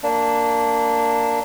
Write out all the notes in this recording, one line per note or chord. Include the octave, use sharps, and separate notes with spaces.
A#3 D4